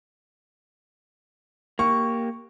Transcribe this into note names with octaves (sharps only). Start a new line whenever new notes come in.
A#3 G4 C#6